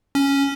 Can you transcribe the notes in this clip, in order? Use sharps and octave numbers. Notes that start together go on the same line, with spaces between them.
C#4